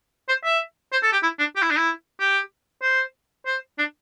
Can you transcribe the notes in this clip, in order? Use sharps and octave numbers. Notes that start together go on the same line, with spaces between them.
C5
E5
C5
A4
G4
E4
D4
G4
E4
D4
E4
G4
C5
C5
D4